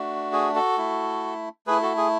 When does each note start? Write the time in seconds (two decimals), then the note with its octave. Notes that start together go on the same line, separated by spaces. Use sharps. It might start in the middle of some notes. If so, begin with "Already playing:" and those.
Already playing: A3 D4 F#4
0.33 G#4
0.55 F#4 A4
0.77 A3 E4
1.67 A3 E4 G#4 B4
1.82 F#4 A4
1.97 G#4